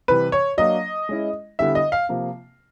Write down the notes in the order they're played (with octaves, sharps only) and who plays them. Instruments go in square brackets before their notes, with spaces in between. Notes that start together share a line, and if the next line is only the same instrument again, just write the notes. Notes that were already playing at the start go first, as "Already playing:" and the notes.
[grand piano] C3 E3 G3 [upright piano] B4
[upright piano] C#5
[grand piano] F#3 A#3 D4 [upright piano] D#5
[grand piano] G#3 C#4 E4
[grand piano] D3 G3 B3 E4 A4 [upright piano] E5
[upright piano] D#5
F5
[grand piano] C3 F3 A#3